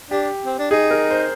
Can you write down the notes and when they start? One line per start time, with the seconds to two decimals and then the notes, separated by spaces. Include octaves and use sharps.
0.10 D4 G4
0.46 C4
0.59 D4
0.71 D#4 G#4
0.91 A#4
1.11 C5